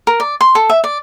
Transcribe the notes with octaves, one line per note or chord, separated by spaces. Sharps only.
A#4
D5
C6
A4
E5
D5